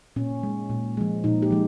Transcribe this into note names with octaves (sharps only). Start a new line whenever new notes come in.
A#2 C#4
G#3
A#2
F3 G#3
A#2 D#4
G4
F3 G#3